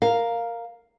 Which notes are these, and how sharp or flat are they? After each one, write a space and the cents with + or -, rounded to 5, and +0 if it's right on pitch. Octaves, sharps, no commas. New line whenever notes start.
A#4 +0 F5 +0